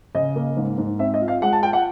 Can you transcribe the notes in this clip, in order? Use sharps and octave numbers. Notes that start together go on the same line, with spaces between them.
C#3 D#5
A#3
G#2
G#2
C4 E5
D#5
F4
F5
G#3 F#5
A5
F4 G5
F#5